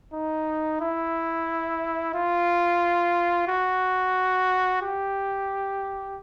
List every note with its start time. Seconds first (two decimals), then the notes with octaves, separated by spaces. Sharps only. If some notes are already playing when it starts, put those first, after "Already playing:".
0.14 D#4
0.81 E4
2.14 F4
3.48 F#4
4.82 G4